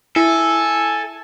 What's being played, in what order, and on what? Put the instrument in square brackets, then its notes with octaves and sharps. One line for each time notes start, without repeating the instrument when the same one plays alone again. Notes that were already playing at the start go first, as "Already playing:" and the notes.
[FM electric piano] E4 [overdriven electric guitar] A4 [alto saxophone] G#5